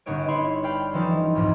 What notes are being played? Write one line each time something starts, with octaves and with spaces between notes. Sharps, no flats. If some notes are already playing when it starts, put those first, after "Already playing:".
G1 B3 C#4 D#4 C#5 D7
E4 C#5 B5 C6
G4 D5 F5 G5 B5
E3 F3 C#4 D#4 A4
C2 F2 G#2